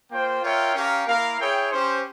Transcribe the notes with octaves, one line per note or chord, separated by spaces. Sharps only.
A#3 F4 C5 G5
F4 A#4 C#5 E5 G5
C#4 G4 A#4 F5
A#3 E4 A#4 F5
E4 G#4 C#5 G5
C#4 G4 C5